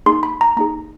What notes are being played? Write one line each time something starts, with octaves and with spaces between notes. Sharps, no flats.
A#3 D#4 G#4 C6
B5
A#5
A#3 D#4 G#4 A#5